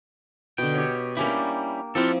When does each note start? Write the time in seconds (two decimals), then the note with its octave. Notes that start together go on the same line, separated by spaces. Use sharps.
0.58 B2 D3 G5
0.74 G4 C#5
1.17 G3 A#3 C#4 D4 E4 G4
1.95 F3 C4 E4 F4 G4 A4